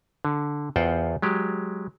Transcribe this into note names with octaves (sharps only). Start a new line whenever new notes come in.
D3
E2 F4 C5 F#5 G5
F#3 G#3 G4